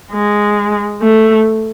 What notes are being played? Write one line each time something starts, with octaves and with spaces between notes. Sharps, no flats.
G#3
A3